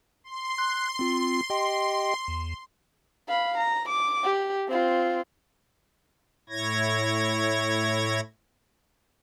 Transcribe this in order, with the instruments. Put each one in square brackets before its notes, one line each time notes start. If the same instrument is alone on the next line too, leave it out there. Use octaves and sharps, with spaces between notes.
[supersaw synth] C6
[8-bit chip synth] F#6
C4 F4
G4 D#5 G5
E2
[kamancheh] F5 B5
A#5
D6
G4
C4 F4
[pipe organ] A2 E4 C#5 G#6 A#6